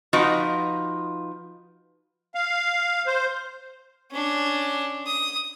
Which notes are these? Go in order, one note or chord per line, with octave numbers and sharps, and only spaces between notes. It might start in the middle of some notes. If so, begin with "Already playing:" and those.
F3 D#4 F4 F#4 B4
F5
C5
C#4 D4
D#6